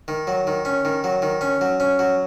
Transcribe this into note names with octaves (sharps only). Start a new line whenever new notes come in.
D#3
F#3
D#3
C#4
D#3
F#3
D#3
C#4
F#3
C#4
F#3